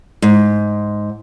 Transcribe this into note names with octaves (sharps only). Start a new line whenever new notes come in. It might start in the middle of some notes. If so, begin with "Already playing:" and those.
G#2